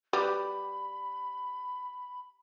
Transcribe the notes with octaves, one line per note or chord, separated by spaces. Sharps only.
G3 F#4 G4 B4 B5